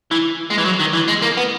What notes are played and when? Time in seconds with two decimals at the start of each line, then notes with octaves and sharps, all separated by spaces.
0.11 E3
0.50 G#3
0.58 E3
0.65 F#3
0.79 D#3
0.93 E3
1.08 G#3
1.22 A#3
1.37 B3